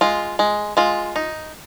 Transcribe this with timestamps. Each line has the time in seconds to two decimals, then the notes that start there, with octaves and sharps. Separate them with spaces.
0.01 G#3 F4
0.39 G#3
0.77 G#3 F4
1.16 D#4